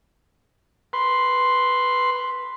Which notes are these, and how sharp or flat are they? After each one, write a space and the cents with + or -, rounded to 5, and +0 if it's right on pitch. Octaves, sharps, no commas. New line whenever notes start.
B4 +0 C6 +0